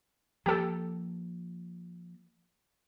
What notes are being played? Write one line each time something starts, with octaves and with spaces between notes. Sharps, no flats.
F3 A#3 G4 A4